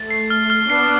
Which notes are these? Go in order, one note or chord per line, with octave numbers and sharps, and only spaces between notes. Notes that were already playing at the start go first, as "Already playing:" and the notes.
Already playing: A3 A6
C7
F6
F6
B3 D4 C7